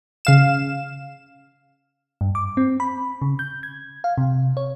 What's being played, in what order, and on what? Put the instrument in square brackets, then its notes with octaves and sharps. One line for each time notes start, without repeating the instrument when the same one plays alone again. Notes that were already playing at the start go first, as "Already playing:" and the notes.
[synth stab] C#3 F5 E7
[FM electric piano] G2
D6
C4
B5
C#3
G6
G#6
F5
C3
C#5